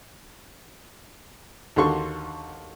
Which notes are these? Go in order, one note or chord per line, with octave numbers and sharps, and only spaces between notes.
D#2 D3 F#4 A4 C6 C#6